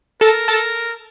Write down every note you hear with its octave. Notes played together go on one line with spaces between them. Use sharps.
A4 A#4 A5
A4 A5